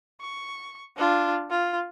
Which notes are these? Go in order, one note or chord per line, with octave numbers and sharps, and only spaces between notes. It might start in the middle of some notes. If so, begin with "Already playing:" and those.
C#6
D4 F4
F4